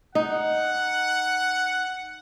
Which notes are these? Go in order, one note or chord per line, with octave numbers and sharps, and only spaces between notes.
D#4 F#5